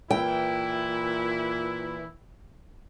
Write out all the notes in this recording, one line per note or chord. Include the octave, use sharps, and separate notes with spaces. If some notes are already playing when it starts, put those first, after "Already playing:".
A#2 E3 E4 G5